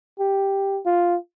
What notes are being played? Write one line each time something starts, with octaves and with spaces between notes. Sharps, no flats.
G4
F4